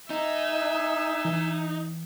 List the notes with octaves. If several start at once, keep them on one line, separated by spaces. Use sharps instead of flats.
D#4 E5 G#5
E3